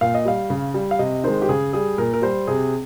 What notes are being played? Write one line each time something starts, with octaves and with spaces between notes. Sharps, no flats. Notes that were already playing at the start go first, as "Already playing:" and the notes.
A#2 F5
D#5
G3 F5
C#3
G3
F5
C3 D#5
D#3 G#3 C5
G4
C#3 G#4
G3 G#4
A#2 A#4
A#4
G3 C5
C3 G#4